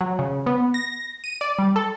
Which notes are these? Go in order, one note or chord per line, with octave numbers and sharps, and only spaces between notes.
F#3
C#3
B3
A#6
D#7
D5
G3
A4